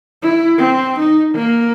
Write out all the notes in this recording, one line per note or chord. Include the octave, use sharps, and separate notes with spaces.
E4
C4
D#4
A#3